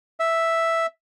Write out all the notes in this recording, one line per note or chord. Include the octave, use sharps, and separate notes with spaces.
E5